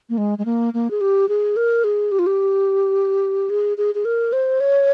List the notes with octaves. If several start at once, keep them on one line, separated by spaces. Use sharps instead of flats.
A#3
G#3
G#3
A#3
A#3
G#4
G4
G#4
A#4
G#4
G4
F4
G4
G#4
G#4
G#4
A#4
C5
C#5